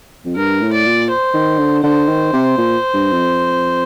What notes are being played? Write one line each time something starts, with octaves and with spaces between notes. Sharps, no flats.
F2
G2 A#4
A2
D5
A#2
C5
D#3
D3
D3 C5
D#3
C3
A#2
G2
F2